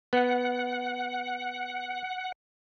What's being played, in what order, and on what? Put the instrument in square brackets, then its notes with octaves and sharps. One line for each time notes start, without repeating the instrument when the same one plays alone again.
[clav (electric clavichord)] B3 [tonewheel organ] F#5